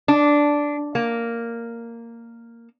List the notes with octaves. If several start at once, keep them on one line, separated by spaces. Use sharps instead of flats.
D4
A#3